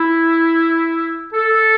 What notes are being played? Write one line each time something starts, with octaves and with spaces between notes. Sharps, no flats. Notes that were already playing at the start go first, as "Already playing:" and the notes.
Already playing: E4
A4